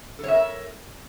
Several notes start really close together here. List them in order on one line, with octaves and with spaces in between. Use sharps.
A4 C#5 E5 A#4